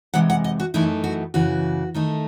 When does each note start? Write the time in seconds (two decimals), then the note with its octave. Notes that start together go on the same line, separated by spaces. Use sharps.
0.14 C3 E3 G#3 D#4 F#5
0.30 F#5
0.44 D#5
0.60 F#4
0.74 F#2 E3 A3 D#4 E4
1.04 F#4
1.34 F#2 C#3 E3 F#4
1.95 D#3 A3 D#4